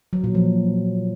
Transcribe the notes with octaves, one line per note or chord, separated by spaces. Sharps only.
F#3
A#2
F3